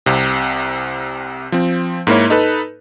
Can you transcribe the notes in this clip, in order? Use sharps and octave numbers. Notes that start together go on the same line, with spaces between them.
C2 C3
F3 C4
G#2 A#3 E4 C#5
D#4 A4 B4